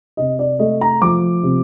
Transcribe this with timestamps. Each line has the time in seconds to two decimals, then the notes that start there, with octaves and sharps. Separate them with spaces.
0.17 C3 D#5
0.39 D5
0.59 A3 D#5
0.81 A#5
1.02 F3 D6
1.43 C3